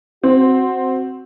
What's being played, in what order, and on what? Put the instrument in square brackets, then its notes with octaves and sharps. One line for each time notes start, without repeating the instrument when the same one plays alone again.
[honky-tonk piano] C4 [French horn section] F#4